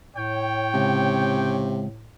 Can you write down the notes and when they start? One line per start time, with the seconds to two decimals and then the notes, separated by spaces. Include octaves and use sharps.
0.17 A2 C#5 G5
0.74 C#2 C3